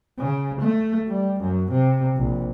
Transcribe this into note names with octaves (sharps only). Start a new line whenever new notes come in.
C#3
A3
G3
F#2
C3
A#1